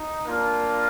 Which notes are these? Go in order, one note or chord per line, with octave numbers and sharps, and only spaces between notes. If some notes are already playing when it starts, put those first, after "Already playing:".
Already playing: D#4
A#3 D4 F4 A#4